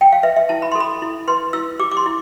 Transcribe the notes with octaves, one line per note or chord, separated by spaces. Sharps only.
G5
F5
B4 E5
E5
E4 A5
B5
A4 C6
B5
E4
B4 C6
E4 E6
G4 D6
D6
C6
E4